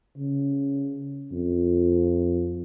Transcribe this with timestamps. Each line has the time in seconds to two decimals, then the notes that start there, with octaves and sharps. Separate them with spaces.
0.17 C#3
1.32 F2